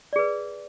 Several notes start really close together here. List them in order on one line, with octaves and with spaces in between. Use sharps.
D5 G#4 B4